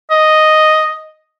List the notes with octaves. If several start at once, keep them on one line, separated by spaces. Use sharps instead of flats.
D#5